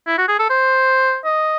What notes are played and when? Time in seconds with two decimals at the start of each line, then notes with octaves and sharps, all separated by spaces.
0.07 E4
0.18 F#4
0.28 G#4
0.39 A4
0.50 C5
1.25 D#5